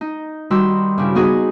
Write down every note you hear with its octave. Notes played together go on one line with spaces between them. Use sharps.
D#4
D#3 G3 F#4 C6 E6
G2 C#3 E4
B3 D#4 F#4 G#4